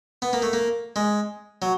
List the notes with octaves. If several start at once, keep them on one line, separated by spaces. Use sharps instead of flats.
B3
A#3
A3
A#3
G#3
F#3